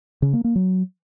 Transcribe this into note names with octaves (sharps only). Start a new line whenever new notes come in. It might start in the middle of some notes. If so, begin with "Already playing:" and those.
C#3
A#3
A#3
F#3